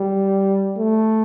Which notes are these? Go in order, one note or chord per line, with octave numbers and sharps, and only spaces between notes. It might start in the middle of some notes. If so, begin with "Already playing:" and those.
Already playing: G3
A3